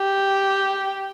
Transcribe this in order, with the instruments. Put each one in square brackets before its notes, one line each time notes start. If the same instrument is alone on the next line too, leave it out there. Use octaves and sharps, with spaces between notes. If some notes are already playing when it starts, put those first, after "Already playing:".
Already playing: [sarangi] G4